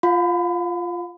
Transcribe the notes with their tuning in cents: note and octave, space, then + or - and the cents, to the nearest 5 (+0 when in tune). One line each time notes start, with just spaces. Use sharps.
F4 -5 F5 +40 B5 +35